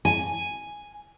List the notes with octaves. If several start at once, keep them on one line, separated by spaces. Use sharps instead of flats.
G#5